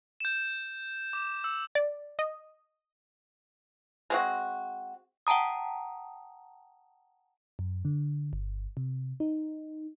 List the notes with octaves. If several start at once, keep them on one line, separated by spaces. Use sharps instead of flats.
G6 E7
D6
E6
D5
D#5
G#3 C4 F#4
F#5 G5 A5 A#5 D#6
F#2
D3
G1
C3
D#4